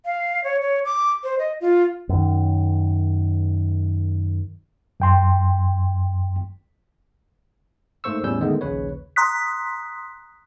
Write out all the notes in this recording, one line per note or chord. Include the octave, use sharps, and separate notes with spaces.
F5
C#5
C#5
D6
C5
D#5
F4
F#2 D#3
F#2 G5 C6
G#2 A3 A#3 C5 C#6 E6
E2 A2 G3 C#4 E6 G6
D3 D#3 G#3 A3 B3
A#1 D#2 C#3 B4 C#5
A#5 C6 D#6 F#6 B6